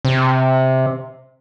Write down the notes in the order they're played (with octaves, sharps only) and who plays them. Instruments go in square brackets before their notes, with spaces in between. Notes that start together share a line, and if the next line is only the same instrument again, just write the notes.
[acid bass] C3